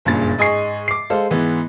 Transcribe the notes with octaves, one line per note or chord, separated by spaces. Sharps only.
F#1 G2 A#2 G#4 A6
G#2 D#5 G#5 C#6 C7
D6 C7
G#3 A4 C5 F5
G#2 E3 B3